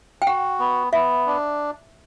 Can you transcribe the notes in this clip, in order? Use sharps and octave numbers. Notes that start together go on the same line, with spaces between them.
G5
F#4 F#5
B3
B3 E5
D4